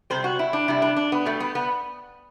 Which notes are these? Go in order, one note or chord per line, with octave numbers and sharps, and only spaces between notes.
C3 G3 C5
F#4
E4
D4
C3 G3 E4
D4
D4
B3
B2 G3 A3
B3
B3